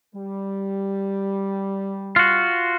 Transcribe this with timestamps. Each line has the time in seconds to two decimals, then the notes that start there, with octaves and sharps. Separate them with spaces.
0.15 G3
2.16 F4 F#4